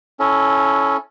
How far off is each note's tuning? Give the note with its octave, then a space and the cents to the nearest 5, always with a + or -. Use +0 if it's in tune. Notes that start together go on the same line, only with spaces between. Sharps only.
C#4 +0 E4 -5 A4 -20